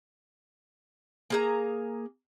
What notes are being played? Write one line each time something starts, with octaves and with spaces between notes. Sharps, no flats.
A#3 G#4 A#5